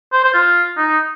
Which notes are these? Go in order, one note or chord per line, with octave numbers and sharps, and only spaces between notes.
C5
C5
F4
D#4